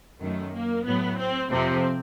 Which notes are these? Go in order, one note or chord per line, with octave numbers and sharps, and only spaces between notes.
F#2 D#3 F#3 A3
A#3
A2 F#3 B3
C4
F2 C3 F3 C4